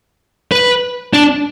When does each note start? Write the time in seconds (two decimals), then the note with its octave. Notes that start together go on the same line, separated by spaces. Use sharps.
0.52 B4
1.13 D4